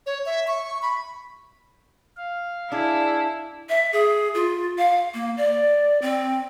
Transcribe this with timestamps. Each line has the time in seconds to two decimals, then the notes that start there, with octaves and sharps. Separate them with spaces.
0.06 C#5
0.26 E5
0.47 C#6
0.82 B5
2.17 F5
2.72 D4 E4 G#4
3.69 E5
3.93 G#4
4.34 F4
4.78 F5
5.14 A#3
5.37 D5
6.02 C4